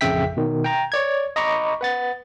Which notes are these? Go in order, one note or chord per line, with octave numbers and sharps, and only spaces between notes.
A1 F2 C#3 E5 G5 B6
B2 D#3
G5 A#5
C#5 D5 G#6
D#5 A#5 B5 C#6 D6
B4 F#5 A6